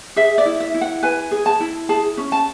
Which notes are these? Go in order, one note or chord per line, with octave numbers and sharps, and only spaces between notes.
G#4 E5
D5
E4
E5
E4
F#5
B4 G#5
G#4
A5
E4
G#4 A5
C#4
A5